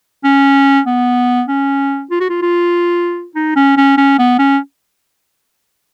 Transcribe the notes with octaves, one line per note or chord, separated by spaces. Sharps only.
C#4
B3
C#4
F4
F#4
F4
F4
D#4
C#4
C#4
C#4
B3
C#4